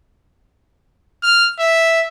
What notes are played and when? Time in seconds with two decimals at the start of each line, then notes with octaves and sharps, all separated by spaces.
1.23 F6
1.60 E5